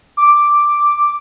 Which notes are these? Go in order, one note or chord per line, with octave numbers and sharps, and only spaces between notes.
D6